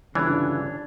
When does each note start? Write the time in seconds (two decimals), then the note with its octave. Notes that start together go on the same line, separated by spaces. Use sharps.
0.15 G1 C#3 E3 D4 C#5 F#6